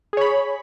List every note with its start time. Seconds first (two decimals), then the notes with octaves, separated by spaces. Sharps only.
0.13 G#4
0.17 C#5
0.21 B5